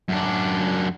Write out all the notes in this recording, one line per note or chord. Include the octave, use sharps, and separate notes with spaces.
F#2 D4